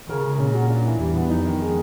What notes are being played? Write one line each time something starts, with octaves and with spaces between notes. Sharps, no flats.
C#3 A#4
G#3
A#2 C#4
F#4
D4
E3
E2 G3
B3
F2 D#4
D#3
G#3